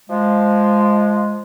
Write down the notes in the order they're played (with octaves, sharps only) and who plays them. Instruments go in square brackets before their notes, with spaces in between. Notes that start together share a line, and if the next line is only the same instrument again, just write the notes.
[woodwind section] F3 G#3